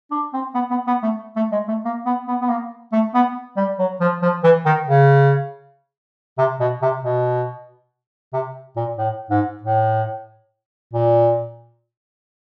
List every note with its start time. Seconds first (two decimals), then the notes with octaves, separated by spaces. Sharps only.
0.11 D4
0.34 C4
0.55 B3
0.71 B3
0.87 B3
1.03 A3
1.36 A3
1.52 G#3
1.68 A3
1.85 A#3
2.06 B3
2.28 B3
2.41 B3
2.50 A#3
2.92 A3
3.14 B3
3.57 G3
3.79 F#3
4.01 F3
4.22 F3
4.44 E3
4.66 D#3
4.88 C#3
6.38 C3
6.60 B2
6.82 C3
7.03 B2
8.33 C3
8.76 A#2
8.98 A2
9.30 G#2
9.63 A2
10.93 A#2